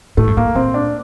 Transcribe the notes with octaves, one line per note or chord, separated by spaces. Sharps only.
A2 A3
G2
A2 A#3
A#2 C4
D4